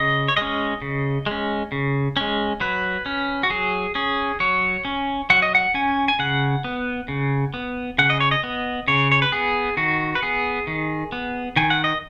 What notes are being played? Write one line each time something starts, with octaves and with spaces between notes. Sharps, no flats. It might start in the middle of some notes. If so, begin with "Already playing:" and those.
Already playing: C#3 D#5
C#5
G#3 C#4 D#5
C#3
G#3 C#4
C#3
G#3 C#4
F#3 B4
C#4
F#4
F#3 G#4
C#4 G#4
F#3 C#5
C#4
F#3 F#5
D#5
F#5
C#4 G#5
G#5
C#3 F#5
B3
C#3
B3
C#3 F#5
D#5
C#5
D#5
B3
C#3 C#5
C#5
B4
B3 G#4
D#3 F#4
B4
B3 G#4
D#3
B3
D#3 G#5
F#5
D#5